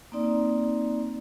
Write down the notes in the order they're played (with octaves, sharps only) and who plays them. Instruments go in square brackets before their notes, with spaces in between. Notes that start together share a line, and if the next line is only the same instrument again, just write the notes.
[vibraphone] A#3 C4 D#4 D5